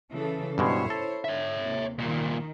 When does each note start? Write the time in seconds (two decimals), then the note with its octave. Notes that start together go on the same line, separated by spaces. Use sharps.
0.12 C#3 E3 A4
0.58 G2 B2 G#3 E4 C5 C#5
0.90 A4
1.25 D3 C#5 E5
1.61 D#2 C3
1.99 C2 A#2 D#3